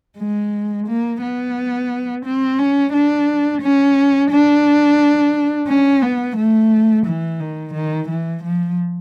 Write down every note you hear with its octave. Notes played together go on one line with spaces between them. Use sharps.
G#3
A#3
B3
C4
C#4
D4
C#4
D4
C#4
B3
A3
E3
D#3
D#3
E3
F3